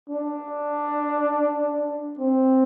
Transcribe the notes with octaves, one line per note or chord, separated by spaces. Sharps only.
D4
C4